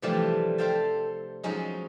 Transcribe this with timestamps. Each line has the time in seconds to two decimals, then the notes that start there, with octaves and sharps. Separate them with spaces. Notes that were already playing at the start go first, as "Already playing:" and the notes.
0.02 C3 E3 F3 G3 A3 D4
0.58 A4 C5 E5 F5 G5 A5
1.43 F3 F#3 G#3 C#4 D#4